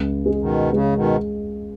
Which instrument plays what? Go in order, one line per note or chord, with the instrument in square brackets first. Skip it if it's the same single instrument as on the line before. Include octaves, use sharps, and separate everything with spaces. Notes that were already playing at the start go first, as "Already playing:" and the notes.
Already playing: [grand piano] C#2
G#3
[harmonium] B2 D#3
[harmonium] C#3 [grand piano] G#3
[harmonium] B2 D#3